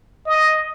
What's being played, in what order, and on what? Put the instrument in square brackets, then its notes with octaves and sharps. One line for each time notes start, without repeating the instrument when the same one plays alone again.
[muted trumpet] D#5